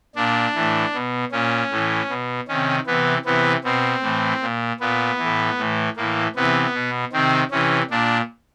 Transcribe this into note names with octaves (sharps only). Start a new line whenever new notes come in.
A#2 D4
A2 E3
B2
A#2 C#4
A2 E3
B2
C3 D#3 C#4
C3 E3 B3
C3 E3 B3
B2 C4
A2 E3
A#2
A#2 B3
E3
A2
A2 E3
A2 E3 A#3
C3 E3 B3
B2
C3 D#3 C4
C3 E3 C#4
A#2 D4